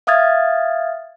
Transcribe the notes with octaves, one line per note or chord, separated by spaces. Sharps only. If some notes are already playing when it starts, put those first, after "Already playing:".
E5 F5 D#6 F6 G#6 A6